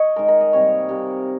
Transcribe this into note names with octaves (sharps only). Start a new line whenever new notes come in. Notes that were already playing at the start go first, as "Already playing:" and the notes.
Already playing: C#5 D#5
D#3 G#3 A#4
A#4
D#5
C3 G3 A#3 C#5
C3 G3 A#3